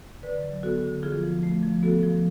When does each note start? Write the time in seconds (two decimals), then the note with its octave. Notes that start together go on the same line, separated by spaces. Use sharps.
0.23 D3 B4 D5
0.43 F#3
0.63 B3 F#4 A4
0.83 D3
1.03 F3 F4 G#4
1.23 F3
1.43 A3
1.63 F3
1.83 B3 F#4 A4
2.03 F3